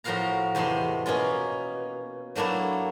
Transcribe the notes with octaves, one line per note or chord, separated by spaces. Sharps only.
A2 F3 F#4 A#4 F5 A#5
E2 C3 A3 D#5 C6
B2 A#3 C#4 F4
F#3 A3 A#3 D4 E4